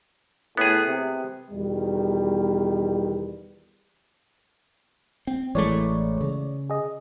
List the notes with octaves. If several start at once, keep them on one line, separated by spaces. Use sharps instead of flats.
A2 B3 G#4
C3
E2 B2 D#3 G3
C4
A1 E3 G#3 A3 C#5 D5
C#3
G#4 D#5